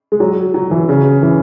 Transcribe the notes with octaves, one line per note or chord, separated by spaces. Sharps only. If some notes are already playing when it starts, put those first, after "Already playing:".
G#3
F#3
F#3
E3
C#3
E3